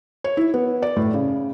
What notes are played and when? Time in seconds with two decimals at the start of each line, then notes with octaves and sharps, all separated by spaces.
0.24 C#5
0.37 E4
0.54 B3
0.82 D5
0.96 A2
1.14 C#3